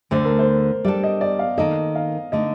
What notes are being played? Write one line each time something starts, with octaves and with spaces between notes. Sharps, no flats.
D2 D3 A3 C5
A#4
C5
G3 D4 A4 D5
D#5
D5
F5
D#3 A#3 D#4 A4 D#5
F5
D3 A3 D#4 D#5